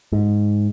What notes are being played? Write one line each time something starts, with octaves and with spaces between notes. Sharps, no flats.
G#2